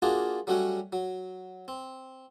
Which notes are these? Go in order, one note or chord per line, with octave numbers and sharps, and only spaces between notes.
A#3 D4 F4 F#4 G#4 A5
F#3 G3 A3 C#4 F#4 F#5
F#3
C4